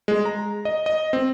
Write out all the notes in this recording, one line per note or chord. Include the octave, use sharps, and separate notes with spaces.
G#3
A#5
D#5
D#5
C4